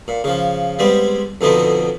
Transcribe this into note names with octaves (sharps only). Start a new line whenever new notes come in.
A#2
C#3 F3
G3 G#3 B3 C4
F2 B2 D3 B3 C4 D#4